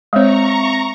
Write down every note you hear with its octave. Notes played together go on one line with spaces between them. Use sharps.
G#3 C4 C#5 E5 F5 A#5 C#6